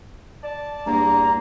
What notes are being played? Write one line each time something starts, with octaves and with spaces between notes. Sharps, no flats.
D5 A5
E2 G2 A#3 A#5